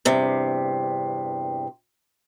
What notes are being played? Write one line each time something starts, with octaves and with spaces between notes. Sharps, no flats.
E2 G2 C3